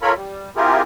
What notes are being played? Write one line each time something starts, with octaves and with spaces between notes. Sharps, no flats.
D#3 F4 A4 A#4 C#5 B5
G3
C4 E4 F4 G4 G#4 A#4